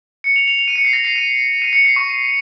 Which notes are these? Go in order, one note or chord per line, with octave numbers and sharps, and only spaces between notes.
C#7
F7
F7
F7
D#7
C#7
C7
A#6
C7
D#7
D#7
C#7
C7
C#6